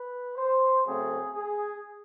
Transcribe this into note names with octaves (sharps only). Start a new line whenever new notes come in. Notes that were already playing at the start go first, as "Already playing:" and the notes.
Already playing: B4
C5
C#3 F#3 A3 C4 G#4
G#4